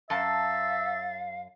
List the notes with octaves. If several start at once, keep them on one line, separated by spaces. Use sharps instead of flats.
F#2 E5 F5 A5 A6